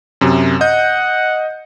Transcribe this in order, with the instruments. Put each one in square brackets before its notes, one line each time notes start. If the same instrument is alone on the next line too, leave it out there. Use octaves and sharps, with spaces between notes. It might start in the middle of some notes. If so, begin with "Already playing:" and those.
[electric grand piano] F#2 C3
[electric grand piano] D#5 G6 [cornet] F#5